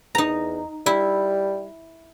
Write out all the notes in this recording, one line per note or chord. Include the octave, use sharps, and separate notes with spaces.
E2 D#4 A#5
G3 E4